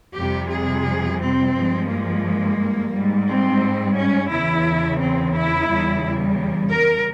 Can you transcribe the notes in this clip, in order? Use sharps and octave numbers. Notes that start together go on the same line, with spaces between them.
F2 C3 G3 G4
G#4
C4
G2 F3 G#3
A#3
G#2 G3
C4
C#4
E2 C#3 E3 E4
C4
E4
E2 C#3 G3
A#4